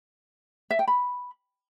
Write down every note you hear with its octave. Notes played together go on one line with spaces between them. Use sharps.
E5
G5
B5